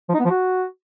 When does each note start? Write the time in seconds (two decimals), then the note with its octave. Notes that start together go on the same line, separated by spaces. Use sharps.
0.09 F3
0.14 D#4
0.19 B3
0.25 F3
0.30 F#4